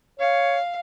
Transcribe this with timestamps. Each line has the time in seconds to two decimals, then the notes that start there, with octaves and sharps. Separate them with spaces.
0.20 C#5 F5